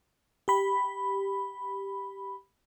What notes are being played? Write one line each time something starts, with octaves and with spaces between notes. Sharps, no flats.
G4 B5